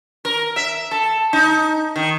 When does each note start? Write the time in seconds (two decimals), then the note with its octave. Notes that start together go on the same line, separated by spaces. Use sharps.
0.25 A#4
0.56 E5
0.91 A4
1.33 D#4
1.96 D#3